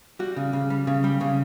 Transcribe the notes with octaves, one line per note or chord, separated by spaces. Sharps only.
G3 F#4
C#3
C#3
G3
C#3
G3
C#3